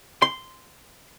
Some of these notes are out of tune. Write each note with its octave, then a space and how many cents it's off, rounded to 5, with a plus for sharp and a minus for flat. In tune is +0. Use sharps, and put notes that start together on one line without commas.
C6 -10